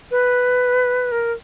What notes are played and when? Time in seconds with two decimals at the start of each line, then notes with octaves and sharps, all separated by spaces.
0.11 B4
1.12 A#4